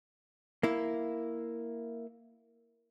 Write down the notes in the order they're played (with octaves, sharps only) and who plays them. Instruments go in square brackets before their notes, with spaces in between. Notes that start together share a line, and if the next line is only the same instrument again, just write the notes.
[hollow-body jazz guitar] A#3 E4